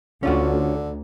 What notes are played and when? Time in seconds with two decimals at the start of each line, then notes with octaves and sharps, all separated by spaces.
0.23 D2 D3 C#4 F4 F#4